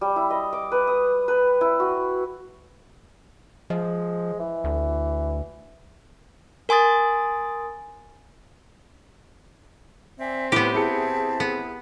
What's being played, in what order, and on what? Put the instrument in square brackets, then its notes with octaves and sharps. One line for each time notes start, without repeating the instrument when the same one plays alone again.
[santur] G3
E4
D#5
D6
B4
D#6
B4
E4
F#4
[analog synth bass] F3 [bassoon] G#3
[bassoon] E3
[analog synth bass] D2
[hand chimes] A#4 G#5 C6 D#6 A6
[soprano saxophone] C4 [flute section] D5 E5 G#5
[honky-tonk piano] A2 [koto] B3 G4 [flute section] B4
[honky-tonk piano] E4 G#4 C#7 [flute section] E5 A5
[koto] B3